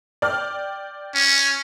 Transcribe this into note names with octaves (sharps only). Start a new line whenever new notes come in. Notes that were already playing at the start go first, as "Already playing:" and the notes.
D5 G5 F6
C#4